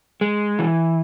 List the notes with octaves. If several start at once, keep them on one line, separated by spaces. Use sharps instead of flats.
G#3
E3